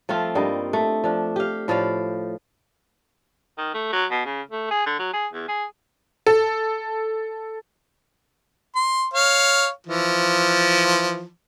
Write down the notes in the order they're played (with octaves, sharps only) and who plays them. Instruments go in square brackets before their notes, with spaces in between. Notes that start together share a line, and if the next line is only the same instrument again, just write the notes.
[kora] F3 A3 C4 F4
G2 G3 A#3 D#4
A3
F3 D4
G4 F5
A2 F3 D5 F5
[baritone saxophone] D#3
A3
F#3
B2
C#3
A3
G#4
D3
F#3
G#4
E2
G#4
[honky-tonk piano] A4
[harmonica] C6
C#5 F5
E3 F3